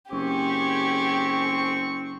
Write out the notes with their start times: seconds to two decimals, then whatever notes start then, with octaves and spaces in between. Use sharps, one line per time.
0.12 F#1 C4 G4 G#4 C#6